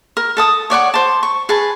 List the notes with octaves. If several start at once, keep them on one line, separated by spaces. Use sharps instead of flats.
A#4
A4 A5 D#6
C#5 D5 F#5 C#6
C5 A5
C#6
G#4 B4 A5